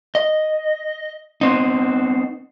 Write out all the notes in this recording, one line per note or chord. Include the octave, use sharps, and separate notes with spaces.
D#5
B3 C4 D#4